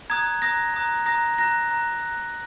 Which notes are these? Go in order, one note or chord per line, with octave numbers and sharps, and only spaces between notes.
A#5 D#6 F#6 G#6
A#5 D#6 F#6 A#6
A#5 D#6 F#6
A#5 D#6 F#6 A#6
A#5 F#6 A#6
A#5 F#6
A#5 F#6